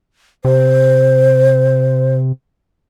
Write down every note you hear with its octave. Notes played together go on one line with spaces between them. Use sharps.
C3 C5